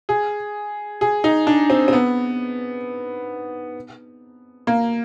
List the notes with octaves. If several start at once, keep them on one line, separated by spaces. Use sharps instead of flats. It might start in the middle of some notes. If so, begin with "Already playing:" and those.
G#4
G#4
D#4
D4
C4
C4
B3
A#3